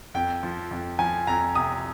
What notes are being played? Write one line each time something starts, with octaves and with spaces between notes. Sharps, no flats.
F2 G5
F3
F2
F3 G#5
F2 A#5
C3 D#6